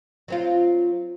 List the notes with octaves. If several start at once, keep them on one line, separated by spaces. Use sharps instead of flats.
F#3 C4 F4